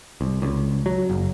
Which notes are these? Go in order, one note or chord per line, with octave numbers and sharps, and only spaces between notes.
C2
C#2
F#3
F#1